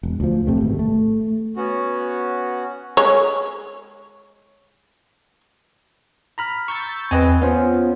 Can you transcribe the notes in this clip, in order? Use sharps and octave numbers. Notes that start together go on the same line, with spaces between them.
E1
D2 F3
A#1 C3 A3
G#1 B2
A3
B3 C#4 F#4
G#3 C#5
A#5 B5 F6
C#6 E6 G6 A6
E2 C4 B4 D#5 G#5
B3 C#4 F4 C5